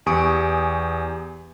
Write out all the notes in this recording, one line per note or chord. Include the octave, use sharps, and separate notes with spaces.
E2 G4 G#5 C#6 D#6 D7